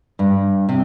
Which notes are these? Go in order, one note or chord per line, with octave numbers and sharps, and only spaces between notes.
G2
C3